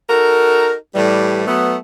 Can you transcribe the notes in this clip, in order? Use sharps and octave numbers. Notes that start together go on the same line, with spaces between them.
D#4 F#4 A4 A#4
A2 E3 G3
F#3 A3 B3